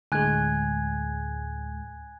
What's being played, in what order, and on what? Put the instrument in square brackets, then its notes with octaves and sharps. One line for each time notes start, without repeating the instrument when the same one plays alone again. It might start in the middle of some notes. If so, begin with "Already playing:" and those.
[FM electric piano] D2 A2 G#3 [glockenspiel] G#5 F#6 G#6